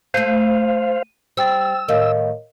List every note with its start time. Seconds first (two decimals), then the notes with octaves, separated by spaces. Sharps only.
0.14 A3 A4 C5 F5 D#7
1.37 G3 C5 G5 E6 A6
1.88 A2 D#3 A#4 D#5 F5